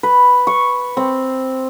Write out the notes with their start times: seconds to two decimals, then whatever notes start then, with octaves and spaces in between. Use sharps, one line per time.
0.03 B4
0.47 C#6
0.97 C4